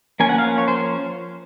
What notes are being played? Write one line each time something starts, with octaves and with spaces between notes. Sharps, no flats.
F3 A#3 C#4 G#5
F#5
F5
C#5
C5